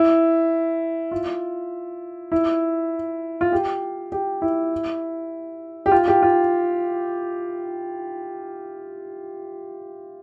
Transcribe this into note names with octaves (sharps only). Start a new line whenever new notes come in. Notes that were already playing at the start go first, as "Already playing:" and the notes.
Already playing: E4
F4
E4
F4
G4
G4
E4
G4
F4
G4
F4